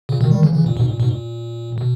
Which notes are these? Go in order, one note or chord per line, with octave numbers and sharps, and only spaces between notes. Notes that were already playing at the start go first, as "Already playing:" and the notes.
A#2 C#3
B2 D#3
D#3 G3
C#3 E3
C#3 E3
A#2
G#2 B2
A#2
G#2 B2
A#2
B2